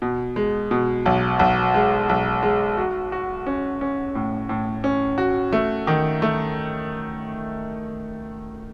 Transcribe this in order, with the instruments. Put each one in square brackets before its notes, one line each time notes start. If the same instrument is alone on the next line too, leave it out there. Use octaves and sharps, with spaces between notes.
[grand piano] B2
G#3
B2
B1
B1
G#3
B1
G#3
F#4
F#4
C#4
C#4
A2
A2
C#4
F#4
A3
D#3
A3